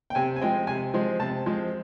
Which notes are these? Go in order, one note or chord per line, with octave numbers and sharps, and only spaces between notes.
G5
C3 G#5
G#5
F3 G#3 C4 G5
C3 G#5
F3 G#3 C4
C3 A5
F3 G#3 C4